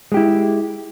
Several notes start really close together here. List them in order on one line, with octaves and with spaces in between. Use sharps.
G#3 G4 E4